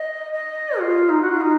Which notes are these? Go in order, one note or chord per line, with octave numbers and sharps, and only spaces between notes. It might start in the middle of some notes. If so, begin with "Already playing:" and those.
Already playing: D#5
D#5
F4
D#4
F#4
F4
D#4